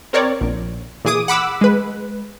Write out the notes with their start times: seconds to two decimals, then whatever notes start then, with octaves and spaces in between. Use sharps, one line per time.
0.13 C4 A#4 C#5 D5
0.41 A#1
1.05 A#2 E3 G#4 D6 D#6
1.28 F#5 B5 D6 E6
1.61 G#3 B4